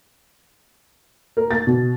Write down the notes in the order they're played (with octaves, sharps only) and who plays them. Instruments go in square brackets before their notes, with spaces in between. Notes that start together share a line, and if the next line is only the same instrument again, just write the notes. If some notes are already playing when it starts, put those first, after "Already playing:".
[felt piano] A#4
A6
B2